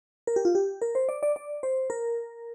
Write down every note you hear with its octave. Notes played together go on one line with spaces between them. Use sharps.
A#4
G4
F4
G4
A#4
C5
D5
D5
D5
C5
A#4